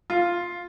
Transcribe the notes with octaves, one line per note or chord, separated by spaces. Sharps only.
F4